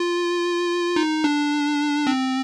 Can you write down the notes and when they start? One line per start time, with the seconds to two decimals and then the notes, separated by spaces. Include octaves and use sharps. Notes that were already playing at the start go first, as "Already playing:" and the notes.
Already playing: F4
0.96 D#4
1.24 D4
2.07 C4